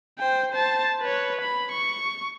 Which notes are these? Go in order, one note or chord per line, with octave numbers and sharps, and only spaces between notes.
C5 G5
C5 A5
B4 C#5
B5
C#6